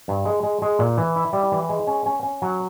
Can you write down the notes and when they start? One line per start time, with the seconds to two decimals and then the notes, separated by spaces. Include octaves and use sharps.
0.08 G2
0.25 G#3
0.43 G#3
0.62 G#3
0.79 A#2
0.97 E3
1.16 E4
1.33 G3
1.52 E3
1.69 G#3
1.87 C#4
2.06 C#4
2.23 C#4
2.42 F#3